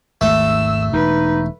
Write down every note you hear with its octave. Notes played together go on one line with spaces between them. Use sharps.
G#1 D#2 A3 E6
E1 B2 D#4 B4